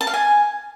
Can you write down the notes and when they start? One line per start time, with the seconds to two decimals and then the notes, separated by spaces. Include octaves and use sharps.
0.01 A5
0.07 F5
0.14 G#5